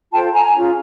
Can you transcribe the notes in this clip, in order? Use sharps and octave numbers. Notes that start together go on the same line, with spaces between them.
F4 A4 C5 G5 A5
G#5 A#5
C#4 F4 G#4